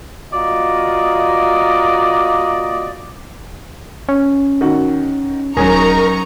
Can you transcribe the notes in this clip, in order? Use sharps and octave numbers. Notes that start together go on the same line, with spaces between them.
A#3 F4 F#4 D5 D#5
C#4
D#3 F#4
D#1 F#3 C#4 D#4 G#4 A#4 A#5 C#6